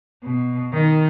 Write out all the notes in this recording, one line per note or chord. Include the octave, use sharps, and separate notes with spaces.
B2
D#3